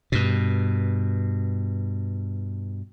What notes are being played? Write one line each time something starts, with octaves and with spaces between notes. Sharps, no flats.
G2 B2